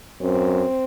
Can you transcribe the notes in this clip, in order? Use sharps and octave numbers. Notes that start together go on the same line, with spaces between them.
F#2 C4